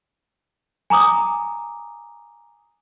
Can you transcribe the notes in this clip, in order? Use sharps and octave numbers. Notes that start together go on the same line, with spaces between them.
G#5 A#5 D6 D#6